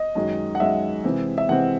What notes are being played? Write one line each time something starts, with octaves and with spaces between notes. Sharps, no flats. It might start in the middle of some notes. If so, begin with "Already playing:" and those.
Already playing: D#5
F#2 D#3 G#3
F#5
F#2 D#3 G#3 E5
C3 E3 G#3 C4
E5
C3 E3 G#3 C4 F#5